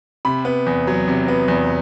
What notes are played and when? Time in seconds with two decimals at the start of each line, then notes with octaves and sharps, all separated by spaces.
0.25 C3 B5
0.45 B3
0.66 E2
0.87 F#3
1.08 C3
1.28 B3
1.48 E2